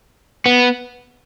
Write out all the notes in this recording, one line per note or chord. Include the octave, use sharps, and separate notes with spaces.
B3